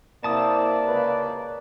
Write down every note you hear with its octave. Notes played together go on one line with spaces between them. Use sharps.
C3 A#3 E4 D5 A5 D#6
C#2 B4